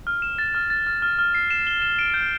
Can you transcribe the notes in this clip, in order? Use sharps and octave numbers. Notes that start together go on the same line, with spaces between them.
F6
E7
A6
F6
A6
F6
F6
F6
C7
E7
G7
E7
D7
G6